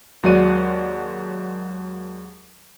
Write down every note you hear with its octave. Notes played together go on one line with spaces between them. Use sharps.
D#2 F#3 G#3 F#4 D5 D#7